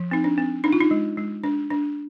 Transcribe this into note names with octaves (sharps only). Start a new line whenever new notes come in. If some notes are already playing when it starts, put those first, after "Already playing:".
Already playing: F3
C4 D#4
D4
C4
D4 D#4
F4
D#4
G#3
G#3
D4
D4